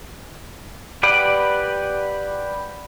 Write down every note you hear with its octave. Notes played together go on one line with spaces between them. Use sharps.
G4 B4 D5 F#5